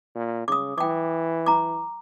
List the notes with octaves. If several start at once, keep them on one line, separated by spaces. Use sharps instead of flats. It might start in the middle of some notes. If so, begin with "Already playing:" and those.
A#2
C#3 D6 D#6
E3 G5 D6
A#5 D6